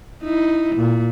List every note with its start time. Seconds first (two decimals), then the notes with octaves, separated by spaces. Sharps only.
0.22 D#4 E4
0.76 A#2